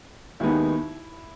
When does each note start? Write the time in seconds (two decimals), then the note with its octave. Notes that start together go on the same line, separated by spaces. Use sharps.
0.40 D#2 D#3 G#3 B3 D#4 E4